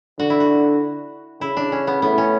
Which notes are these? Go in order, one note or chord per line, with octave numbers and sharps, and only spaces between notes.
D3 F#4
E4
F#4
C#3 E4
D4
C#4
B3
A2 B3
C#4